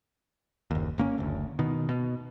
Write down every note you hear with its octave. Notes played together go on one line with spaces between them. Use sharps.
F#1 D#2
G1 A#3 C#4
F#1 D2
B2 D#3
B2